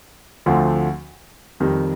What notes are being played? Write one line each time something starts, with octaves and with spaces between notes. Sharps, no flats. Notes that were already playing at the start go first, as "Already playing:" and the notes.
D2 D3 F3 A3 C4
F2 D#3 G3